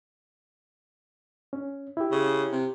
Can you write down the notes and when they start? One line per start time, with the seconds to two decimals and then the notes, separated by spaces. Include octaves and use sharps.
1.53 C#4
1.97 E4 G4
2.12 C#3
2.52 C3